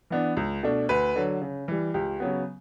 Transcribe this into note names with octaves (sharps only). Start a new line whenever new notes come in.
E3 B3 D4
C#2
B2 A3 D4
D2 B4
D3 F#3
C#3
E3 G3
C#2 G4
C#3 F#3 B3